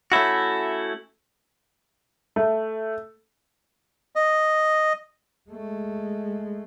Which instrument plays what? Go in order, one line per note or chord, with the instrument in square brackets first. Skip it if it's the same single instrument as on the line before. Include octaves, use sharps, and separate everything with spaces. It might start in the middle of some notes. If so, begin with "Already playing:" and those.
[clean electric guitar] A3 C#4 E4 F#4
[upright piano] A3
[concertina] D#5
[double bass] G#3 A3